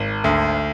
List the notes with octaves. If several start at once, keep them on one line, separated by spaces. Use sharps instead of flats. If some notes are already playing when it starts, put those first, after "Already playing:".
Already playing: G#1
D2